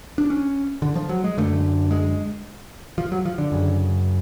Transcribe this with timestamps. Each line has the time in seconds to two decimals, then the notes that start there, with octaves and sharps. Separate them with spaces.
0.18 D4
0.30 C#4
0.82 D3
0.95 F3
1.09 F#3
1.24 G#3
1.38 F#2 D3 A3
1.91 G#3
2.98 F3
3.12 F#3
3.25 F3
3.38 D3
3.52 F#2 C#3